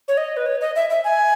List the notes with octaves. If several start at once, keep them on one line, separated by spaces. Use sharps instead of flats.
C#5
D#5
B4
C#5
D#5
E5
E5
G#5